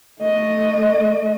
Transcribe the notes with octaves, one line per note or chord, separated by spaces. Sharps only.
A3 D#5